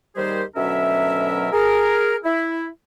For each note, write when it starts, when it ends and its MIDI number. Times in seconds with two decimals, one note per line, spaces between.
0.16 0.42 39
0.16 0.42 51
0.16 0.42 55
0.16 0.42 67
0.16 0.42 68
0.16 0.42 72
0.56 1.47 38
0.56 1.47 47
0.56 1.47 54
0.56 1.47 61
0.56 1.47 70
0.56 1.47 76
1.52 2.16 68
1.52 2.16 70
2.25 2.66 64